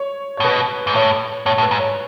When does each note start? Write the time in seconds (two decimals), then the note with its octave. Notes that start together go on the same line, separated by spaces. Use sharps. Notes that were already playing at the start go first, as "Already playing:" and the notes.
Already playing: C#5
0.37 C#5
0.40 A2
0.43 B2 B4
0.87 G#2
0.94 A2 C#5
1.46 A2 C#5
1.58 A2
1.62 B4
1.71 G#2
1.79 C#5